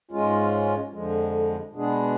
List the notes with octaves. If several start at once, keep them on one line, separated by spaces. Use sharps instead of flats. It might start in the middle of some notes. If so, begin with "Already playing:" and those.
G#2 G#3 C#4 F4
F2 D3 F3 G#3
B2 G#3 B3 D4 G#4